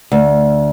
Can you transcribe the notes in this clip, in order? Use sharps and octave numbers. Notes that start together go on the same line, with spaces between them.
D2